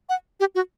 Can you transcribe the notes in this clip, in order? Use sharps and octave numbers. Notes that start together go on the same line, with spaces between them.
F#5
G4
F#4